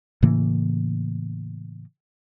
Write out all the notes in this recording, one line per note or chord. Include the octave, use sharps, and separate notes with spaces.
A2 C#3 E3 A#3